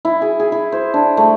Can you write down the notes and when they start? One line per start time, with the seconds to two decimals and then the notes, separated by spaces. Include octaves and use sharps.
0.05 E4
0.22 G#4
0.40 G#4
0.52 E4
0.72 C5
0.94 D4
1.17 A3